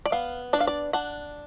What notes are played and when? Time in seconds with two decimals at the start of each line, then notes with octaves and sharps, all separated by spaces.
0.06 D5
0.12 B3 F5
0.53 D4 D5
0.60 F5
0.67 D5
0.93 D4 F#5